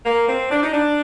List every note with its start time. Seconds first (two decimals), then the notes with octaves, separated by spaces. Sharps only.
0.05 A#3
0.28 C4
0.51 D4
0.63 D#4
0.74 D4